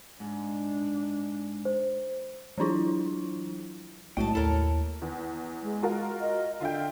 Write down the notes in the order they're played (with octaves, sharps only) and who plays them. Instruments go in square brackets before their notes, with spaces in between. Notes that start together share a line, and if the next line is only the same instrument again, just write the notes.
[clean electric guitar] G#2 [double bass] D4
[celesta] C5
[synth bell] E3 F#3 D4 E4 F4
[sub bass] B1 [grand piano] A2 [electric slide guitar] G#3 F#4 G5 [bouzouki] D#5 A5
[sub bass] D#2 [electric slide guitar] E4 C#5 [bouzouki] A4 A#4
[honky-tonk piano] E2
[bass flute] G#3
[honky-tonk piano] F4 F#4 A#4
[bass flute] D#5
[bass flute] D3 [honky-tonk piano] F4 E5 G5